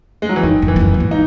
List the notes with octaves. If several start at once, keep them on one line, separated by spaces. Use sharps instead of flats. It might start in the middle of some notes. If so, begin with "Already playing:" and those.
G#3
F#3
E3
F#2 D#3
F#2
E3
E2
F#2
A#2
G#2
D#4